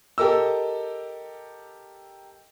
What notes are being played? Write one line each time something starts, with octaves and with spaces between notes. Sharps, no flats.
G4 A4 A#4 D#5 E6